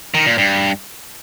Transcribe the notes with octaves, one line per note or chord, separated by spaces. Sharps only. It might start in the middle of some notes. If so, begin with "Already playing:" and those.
D#3
A#2
G2